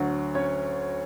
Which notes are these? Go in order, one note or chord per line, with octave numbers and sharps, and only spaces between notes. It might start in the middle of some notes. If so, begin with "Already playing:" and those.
Already playing: D2 D3 F#3 F#4
C#4 C#5